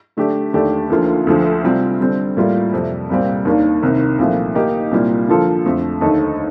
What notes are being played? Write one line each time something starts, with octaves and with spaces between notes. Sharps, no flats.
D3 A3 D4 G4
D#2 D3 A3 D4 G4
D2 D3 F3 A#3 F4
D2 D3 F3 A3
C3 G3 C4 F4
D3 G3 C4
A2 G3 A#3 F4 A#4
F2 C3 G3
C2 A#2 G3 C4
D#2 D#3 A#3 D4
C2 C3 D#3
C2 A#2 F3 A3
D#3 A#3 D#4 G4
C2 A#2 G3 A#3 F4
D3 F3 A#3 F4 A4
F2 D3 A3
D#2 D3 A3 D#4 A4